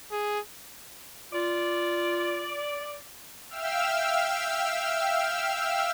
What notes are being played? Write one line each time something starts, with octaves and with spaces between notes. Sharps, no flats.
G#4
F4 D5
E5 F5 G5 E6 F6